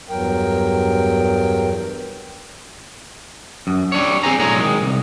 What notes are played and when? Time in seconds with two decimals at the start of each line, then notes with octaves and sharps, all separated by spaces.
0.09 E2 G2 F#3 A#4 G5
3.67 F#2
3.92 G3 D4 C#5
4.23 C4 G4 G#4 C5 G#5 A#5
4.39 B1 A2 G#3 C#5 A#5
4.60 D#3 G#3
4.82 C2